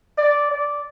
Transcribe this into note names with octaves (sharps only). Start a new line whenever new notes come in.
D5
D5